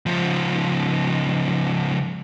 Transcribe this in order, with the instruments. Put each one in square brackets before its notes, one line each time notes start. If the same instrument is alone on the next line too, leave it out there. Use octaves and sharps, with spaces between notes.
[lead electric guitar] C#2 F3